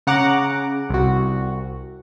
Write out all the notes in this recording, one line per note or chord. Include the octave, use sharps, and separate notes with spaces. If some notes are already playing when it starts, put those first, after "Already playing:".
C#3 F#5 A#5 D6
C2 F#4